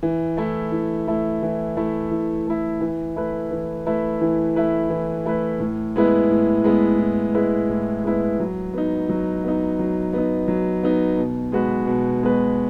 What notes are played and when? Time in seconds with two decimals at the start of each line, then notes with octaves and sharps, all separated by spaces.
0.03 E3
0.37 A3 E4
0.72 E3
1.08 A3 E4
1.43 E3
1.77 A3 E4
2.11 E3
2.47 A3 E4
2.81 E3
3.16 A3 E4 B4
3.51 E3
3.86 A3 E4 B4
4.21 E3
4.56 A3 E4 B4
4.90 E3
5.25 A3 E4 B4
5.60 A2
5.96 G#3 B3 E4 B4
6.30 A2
6.64 G#3 B3 E4 B4
6.99 A2
7.34 G#3 B3 E4 B4
7.69 A2
8.04 G#3 B3 E4 B4
8.40 F#3
8.74 B3 D#4
9.09 F#3
9.44 B3 D#4
9.79 F#3
10.13 B3 D#4
10.48 F#3
10.83 B3 D#4
11.17 B2
11.52 G#3 B3 F#4 B4
11.87 B2
12.23 G#3 B3 F#4 B4